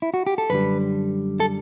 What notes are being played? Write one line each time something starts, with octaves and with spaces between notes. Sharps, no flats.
E4
F#4
G4
A4
F#2 D3 G3 B4
A4